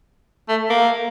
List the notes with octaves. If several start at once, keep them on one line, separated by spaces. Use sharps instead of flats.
A3
A#3